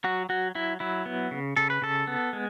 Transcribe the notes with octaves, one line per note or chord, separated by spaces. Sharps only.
F#3 F#4
F#3 F#4
F#3 E4
F#3 E4
B3
C#3
C#3 A4
B4
C#3 A4
B3
G#3